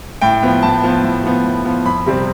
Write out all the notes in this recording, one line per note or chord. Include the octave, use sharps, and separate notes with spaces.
A2 G5
F3 B3
A2 A5
F3 B3
A2
F3 B3
A2
F3 B3
F2 B5
C3 G3 C4